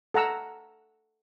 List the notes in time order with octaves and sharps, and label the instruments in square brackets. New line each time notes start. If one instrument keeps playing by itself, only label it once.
[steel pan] A4 F#5 A#5 E6